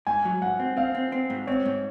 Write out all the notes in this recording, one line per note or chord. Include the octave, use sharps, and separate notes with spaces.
G#2 G#5
F#3
G#2 F#5
C4
C4 F5
C4
C4
G#2
C4 C#5
G#2